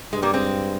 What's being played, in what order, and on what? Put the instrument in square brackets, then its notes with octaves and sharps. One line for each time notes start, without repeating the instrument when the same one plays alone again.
[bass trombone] G2 [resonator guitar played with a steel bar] G#3
[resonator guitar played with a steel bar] G3 A#3
G#3 C4